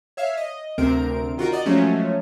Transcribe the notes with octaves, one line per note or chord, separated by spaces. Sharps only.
C#5 E5 F5
D#5
D2 C3 C4 A#4 D7
D#3 F4 F#4 A#4
D5 D#5 F#5
F3 F#3 G#3 A3 C#4